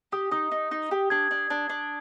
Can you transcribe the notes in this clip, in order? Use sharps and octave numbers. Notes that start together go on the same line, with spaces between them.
G4 D#6
D#4 D#6
D#4
D#4
G4
D4 G#6
D4
D4
D4